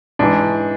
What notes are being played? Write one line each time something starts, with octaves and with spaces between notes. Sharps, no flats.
G#2 E3 D4